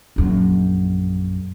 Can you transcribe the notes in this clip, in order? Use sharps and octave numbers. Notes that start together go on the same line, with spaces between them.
A#1 F#2